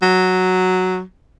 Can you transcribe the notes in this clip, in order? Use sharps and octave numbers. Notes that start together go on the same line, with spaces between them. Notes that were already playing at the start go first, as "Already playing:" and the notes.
F#3